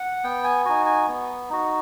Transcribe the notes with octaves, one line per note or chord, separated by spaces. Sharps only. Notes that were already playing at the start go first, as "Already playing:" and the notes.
Already playing: F#5
B3 G5
G#5
D#4 F#4 G#5
G#5
B3
D#4 F#4